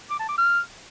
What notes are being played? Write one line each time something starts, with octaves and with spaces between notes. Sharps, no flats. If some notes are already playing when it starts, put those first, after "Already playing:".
D6
A5
D6
F6